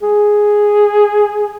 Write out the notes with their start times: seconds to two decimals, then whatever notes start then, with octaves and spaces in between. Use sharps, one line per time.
0.02 G#4